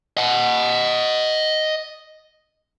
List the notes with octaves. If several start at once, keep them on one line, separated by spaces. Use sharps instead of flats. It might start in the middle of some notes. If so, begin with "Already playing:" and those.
D#5 F#5